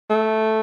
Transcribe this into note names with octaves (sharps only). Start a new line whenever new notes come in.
A3